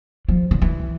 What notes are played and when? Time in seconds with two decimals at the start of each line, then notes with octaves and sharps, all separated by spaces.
0.29 F3
0.51 D3
0.62 E3